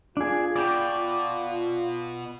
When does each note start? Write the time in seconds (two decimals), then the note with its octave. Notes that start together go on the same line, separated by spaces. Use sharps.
0.17 D4 F4 G#4
0.56 B2 D5 G5